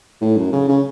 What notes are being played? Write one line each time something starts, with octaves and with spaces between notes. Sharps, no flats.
A2
F#2
C#3
C#3